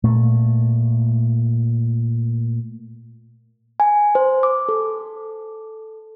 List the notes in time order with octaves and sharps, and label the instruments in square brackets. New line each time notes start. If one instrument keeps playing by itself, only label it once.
[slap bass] A#2 A3
[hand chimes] G#5
C5
D6
A4